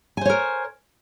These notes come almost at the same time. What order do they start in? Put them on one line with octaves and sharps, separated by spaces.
G#5 C5 C#5 A#4